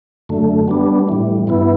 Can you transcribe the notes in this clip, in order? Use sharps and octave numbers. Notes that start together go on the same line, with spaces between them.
F#2 D3 A3
G3 B3 D4
A2 E3 G3
G2 E3 B3 E4